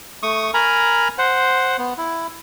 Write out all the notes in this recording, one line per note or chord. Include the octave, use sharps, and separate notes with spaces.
A3 C#6 D#6
A#4 G#5 A#5 B5
C5 F#5
B3
E4